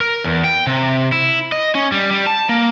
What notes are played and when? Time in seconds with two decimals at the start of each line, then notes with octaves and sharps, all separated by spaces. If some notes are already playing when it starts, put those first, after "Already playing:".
0.01 A#4
0.24 E2
0.44 G5
0.67 C3
1.12 E4
1.52 D#5
1.75 C#4
1.92 G3
2.11 G3
2.27 A5
2.49 A#3